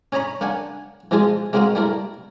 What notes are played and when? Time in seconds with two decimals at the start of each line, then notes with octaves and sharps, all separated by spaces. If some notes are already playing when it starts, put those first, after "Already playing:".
0.12 C#4 C#5 D#5 A#5 B5
0.41 A#3 D4 F#5 G#5
1.11 B2 F3 G#3 F4 G#4 D#5
1.53 G#3 A#3 C4 F#4 D#5 F5
1.75 G3 A3 E4 A#4